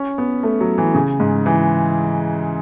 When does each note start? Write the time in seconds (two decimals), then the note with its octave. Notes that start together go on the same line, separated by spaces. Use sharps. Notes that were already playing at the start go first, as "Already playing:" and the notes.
Already playing: C#4
0.18 B3
0.43 A3
0.61 F#3
0.78 E3
0.94 C#3
1.20 G#2
1.46 E3